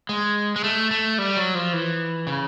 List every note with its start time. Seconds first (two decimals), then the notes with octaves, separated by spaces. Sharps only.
0.09 G#3
0.56 G#3
0.64 A3
0.91 A3
1.18 G3
1.37 F#3
1.55 F3
1.73 E3
2.27 C#3